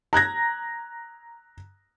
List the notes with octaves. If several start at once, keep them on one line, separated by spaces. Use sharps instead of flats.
A#5 F#6 G#6 A#6